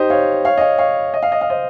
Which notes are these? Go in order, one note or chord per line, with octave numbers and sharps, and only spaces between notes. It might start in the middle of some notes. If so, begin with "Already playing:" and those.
Already playing: D#4 G4 C5 D#5
C#5 F5
C#5 F5
D#5
C#5 F5
C#5 F5
D#5
F5
D#5
F5
C5 D#5